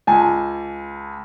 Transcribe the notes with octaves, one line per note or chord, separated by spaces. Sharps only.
C#2 G#5 A5